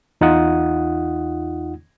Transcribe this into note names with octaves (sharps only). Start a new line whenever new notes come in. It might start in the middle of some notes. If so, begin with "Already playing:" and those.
E2 D#4 F4 F#5 D#6